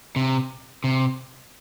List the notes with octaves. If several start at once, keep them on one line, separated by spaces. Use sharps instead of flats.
C3
C3